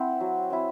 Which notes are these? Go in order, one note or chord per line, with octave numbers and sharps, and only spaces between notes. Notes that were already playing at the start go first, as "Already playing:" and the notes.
Already playing: C4 E4 C5 F#5
F#3
C4 E4